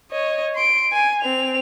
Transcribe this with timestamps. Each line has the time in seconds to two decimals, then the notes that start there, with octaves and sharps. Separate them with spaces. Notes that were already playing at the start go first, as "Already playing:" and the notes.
0.11 C#5 D#5
0.55 C6 D7
0.93 G#5
1.22 C4 F7